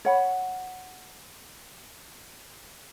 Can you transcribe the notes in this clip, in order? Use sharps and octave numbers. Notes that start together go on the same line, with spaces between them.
C#5 F#5 B5